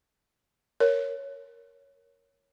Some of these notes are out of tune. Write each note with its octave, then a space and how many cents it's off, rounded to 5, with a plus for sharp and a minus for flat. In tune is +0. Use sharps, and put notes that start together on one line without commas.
A#4 +0 C#5 +0